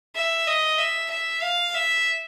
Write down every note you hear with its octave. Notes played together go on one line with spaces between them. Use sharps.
E5
D#5
E5
E5
F5
E5